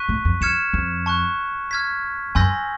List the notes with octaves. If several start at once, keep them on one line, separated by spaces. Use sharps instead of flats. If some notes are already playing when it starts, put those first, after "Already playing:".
Already playing: C#6 F#6 B6 D#7
A2
F2
F2 F6 G#6 C#7 E7
F2
A5 C#6 F#6
F6 G#6 B6
F#2 G#5 C6 E6 G6 A#6